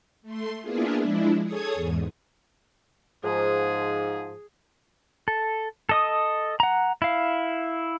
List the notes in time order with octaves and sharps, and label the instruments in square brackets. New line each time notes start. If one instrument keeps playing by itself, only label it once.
[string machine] A3 C6
A#3 B3 D4 E4 F4 G#4
F3 G#3 D4 E4
G#4 A4 C#5 D#6 G#6
E2 G#2
[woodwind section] G#2 F3 [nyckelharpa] G#4
[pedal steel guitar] A4
A4 D#5 D#6
F#5 A#5
E4 F5